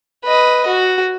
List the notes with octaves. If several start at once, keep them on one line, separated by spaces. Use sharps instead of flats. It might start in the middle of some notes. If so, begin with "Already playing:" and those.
B4 D#5
F#4